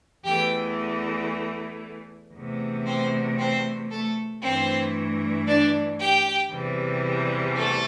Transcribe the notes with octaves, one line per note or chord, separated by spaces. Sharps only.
E2 E3 A3 G4 G5
E2 C3 A3
C4 C5
C4 C5
A3 A4
G2 E3 A3 C4 C5
D4 D5
G4 G5
E2 C3 E3 G3
A3 A4